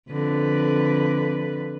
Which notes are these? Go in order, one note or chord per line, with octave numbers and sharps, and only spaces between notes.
F2 D3 B4